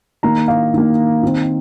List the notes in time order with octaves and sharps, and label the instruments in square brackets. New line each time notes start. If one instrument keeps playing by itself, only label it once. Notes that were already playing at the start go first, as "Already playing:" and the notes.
[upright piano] D#3 A#3 A#5
F5
D#3 A#3
D#3 C4